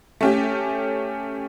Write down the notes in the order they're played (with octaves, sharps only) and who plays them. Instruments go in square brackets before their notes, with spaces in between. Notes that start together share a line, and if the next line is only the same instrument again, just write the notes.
[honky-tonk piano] A3 C#4 G4